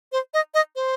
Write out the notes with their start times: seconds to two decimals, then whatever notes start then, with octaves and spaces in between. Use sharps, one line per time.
0.12 C5
0.34 D#5
0.54 D#5
0.75 C5